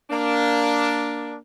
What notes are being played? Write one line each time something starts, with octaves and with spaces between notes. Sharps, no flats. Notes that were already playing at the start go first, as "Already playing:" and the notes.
A#3 D4